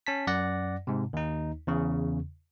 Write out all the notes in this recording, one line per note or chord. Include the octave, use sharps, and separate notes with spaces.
C#4 A5 B6
F#2 D5 F#5 A#6
G#2 C3
D#2 D#4
E2 C#3